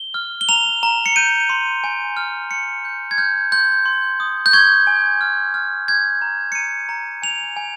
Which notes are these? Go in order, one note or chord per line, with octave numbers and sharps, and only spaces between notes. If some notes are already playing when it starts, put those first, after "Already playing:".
Already playing: G7
F6
G7
A#5 F7
A#5
C#7
G6 D#7
C6
G#5
F6
C6 C#7
G6
G#6
F6 G6
C6 G6
C6
D#6
G6
C#6 G#6
G#5
F6
F6
G6 G#6
A#5
C#7
A#5 D#7
A#5
G#5 F7
G#5